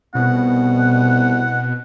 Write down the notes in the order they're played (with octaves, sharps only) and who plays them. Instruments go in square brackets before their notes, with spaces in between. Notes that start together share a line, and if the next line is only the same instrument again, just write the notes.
[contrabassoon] C2 [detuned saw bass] B2 [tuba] B3 [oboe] F#5